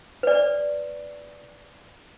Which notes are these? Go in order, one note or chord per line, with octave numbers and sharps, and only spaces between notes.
B4 D5